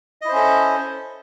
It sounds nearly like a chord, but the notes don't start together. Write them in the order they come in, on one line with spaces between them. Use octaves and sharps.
D#5 E4 C5 C#4 A4